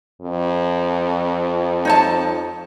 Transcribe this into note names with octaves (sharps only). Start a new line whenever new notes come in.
F2
D#4 C#5 A5